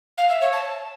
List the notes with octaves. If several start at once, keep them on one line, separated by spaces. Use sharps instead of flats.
F5
E5
C#5
A5